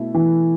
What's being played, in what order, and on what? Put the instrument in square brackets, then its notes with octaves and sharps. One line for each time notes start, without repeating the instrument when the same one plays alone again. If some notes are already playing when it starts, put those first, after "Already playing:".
Already playing: [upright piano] B2 A3 E4
[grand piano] E3